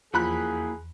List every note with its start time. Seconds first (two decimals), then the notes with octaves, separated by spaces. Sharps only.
0.14 E2 F3 A#3 E4 F#4 G#4 B5 F#6